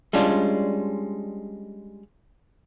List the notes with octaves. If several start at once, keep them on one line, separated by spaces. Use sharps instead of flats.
G3 G#3 C#4 D4 F4